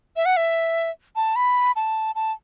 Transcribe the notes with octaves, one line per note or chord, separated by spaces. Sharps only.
E5
F#5
E5
A5
B5
A5
A5